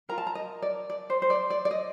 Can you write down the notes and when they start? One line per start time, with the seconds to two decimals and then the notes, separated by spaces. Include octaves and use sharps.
0.09 F4 A#4 A#5
0.18 A5
0.27 A#5
0.35 D#5
0.62 D5
0.90 D5
1.10 C5
1.22 C5
1.30 D5
1.50 D5
1.65 D5
1.71 D#5